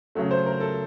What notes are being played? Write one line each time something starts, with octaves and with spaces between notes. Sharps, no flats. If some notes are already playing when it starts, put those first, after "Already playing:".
C#3 F#3 A3
C5
A#4
A4